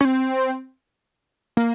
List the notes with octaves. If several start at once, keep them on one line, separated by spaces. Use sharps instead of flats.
C#4
C4
A#3